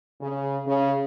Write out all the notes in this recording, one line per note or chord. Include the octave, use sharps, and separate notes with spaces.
C#3
C#3